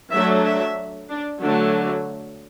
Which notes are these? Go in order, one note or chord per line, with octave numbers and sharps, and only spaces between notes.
F#3 A3 D4 E5
E5
D4
D3 F#3 A3 D4